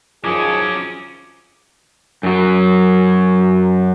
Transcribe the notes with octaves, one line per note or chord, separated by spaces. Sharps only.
D#3 F3 F#3 C#4 G#4 D6 D7
F#2 F#3